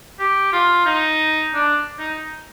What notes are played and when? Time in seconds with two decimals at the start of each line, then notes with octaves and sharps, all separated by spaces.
0.19 G4
0.52 F4
0.86 D#4
1.54 D4
1.99 D#4